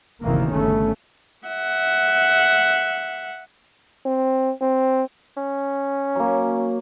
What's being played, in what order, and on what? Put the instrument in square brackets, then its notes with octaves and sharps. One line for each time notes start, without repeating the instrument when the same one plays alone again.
[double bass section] F#1 D2 C3 D#3 E3 A#3
G1 C#3 A3 C#4
[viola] E5 F#5
[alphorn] C4
C4
[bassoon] C#4
[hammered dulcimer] F#3 A#3